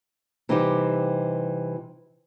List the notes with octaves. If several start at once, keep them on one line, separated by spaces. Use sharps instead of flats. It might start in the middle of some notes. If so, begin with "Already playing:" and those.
C3 E3 G3 C4 D#4 G4